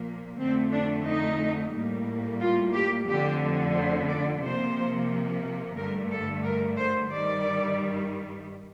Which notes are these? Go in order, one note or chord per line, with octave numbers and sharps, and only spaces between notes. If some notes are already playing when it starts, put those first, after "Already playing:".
Already playing: A#2 F3 A#3
F2 D3 A3 C4
D4
D#4
A2 G3 A#3
F4
G4
F2 D3 F3 A3 G4
C5
D5
C3 F3 A#3 C5
G2 D3 A3 A#4
A4
A#4
C5
G2 D#3 G3 D5